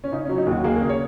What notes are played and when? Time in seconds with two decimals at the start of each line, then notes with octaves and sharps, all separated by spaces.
0.04 C#4
0.12 C#3 D#4
0.25 F#3 C#4
0.38 D#4
0.46 D#2 F#4
0.64 A#3 G#4
0.76 C#3 A#4
0.89 C#5